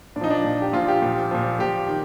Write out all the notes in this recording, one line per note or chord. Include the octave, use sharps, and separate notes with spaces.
A#2 D4
F3 D#4
D4
A#2 F3
G4
A#2 F3 F4
G4
A#2 F3
A#2 F3
A#2 F3 G4
D#3